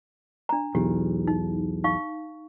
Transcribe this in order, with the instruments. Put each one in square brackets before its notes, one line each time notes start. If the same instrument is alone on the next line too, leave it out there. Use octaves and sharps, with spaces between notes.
[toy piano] D4 A#5
[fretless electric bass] B1 E2 [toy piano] G4
[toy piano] D#4
D#4 F5 C#6